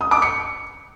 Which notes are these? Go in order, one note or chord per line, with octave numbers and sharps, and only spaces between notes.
D#6
D6
C#7